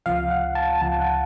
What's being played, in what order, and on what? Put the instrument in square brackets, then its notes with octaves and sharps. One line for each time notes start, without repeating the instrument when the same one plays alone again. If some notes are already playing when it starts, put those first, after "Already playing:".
[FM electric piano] C#2 C3 F3 F5
F#5
A5
C#2 C3 F3 A5
F#5